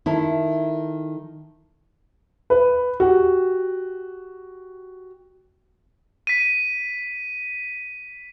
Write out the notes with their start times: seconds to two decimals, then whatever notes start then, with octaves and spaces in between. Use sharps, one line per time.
0.06 D#3 E4 A4
2.50 B4
3.00 F#4 G4
6.27 B6 D#7